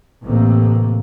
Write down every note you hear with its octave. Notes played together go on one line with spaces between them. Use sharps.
A1 A2 C3 A3 A#3